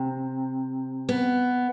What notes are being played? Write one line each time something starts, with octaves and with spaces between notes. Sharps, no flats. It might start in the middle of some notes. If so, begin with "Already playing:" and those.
Already playing: C3
B3